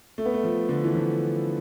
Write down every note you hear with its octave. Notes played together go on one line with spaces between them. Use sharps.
A3
B3
A3
F3
D3
E3
F3